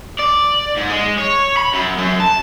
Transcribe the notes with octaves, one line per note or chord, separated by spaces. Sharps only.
D5
G#2
G#3
C#5
B5
F#2
F#2
A5